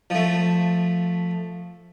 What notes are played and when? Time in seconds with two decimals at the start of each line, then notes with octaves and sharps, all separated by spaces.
0.10 F3 A3